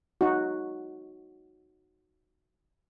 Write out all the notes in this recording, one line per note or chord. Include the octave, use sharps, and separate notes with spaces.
D#4 F#4